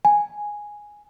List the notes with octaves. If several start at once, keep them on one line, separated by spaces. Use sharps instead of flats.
G#5